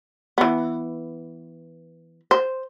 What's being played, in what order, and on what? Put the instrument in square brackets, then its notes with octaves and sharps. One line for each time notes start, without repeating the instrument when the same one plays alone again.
[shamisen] E3 B3
C5